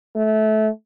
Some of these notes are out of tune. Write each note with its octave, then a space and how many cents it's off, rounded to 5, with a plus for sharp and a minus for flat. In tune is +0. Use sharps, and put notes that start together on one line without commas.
A3 -20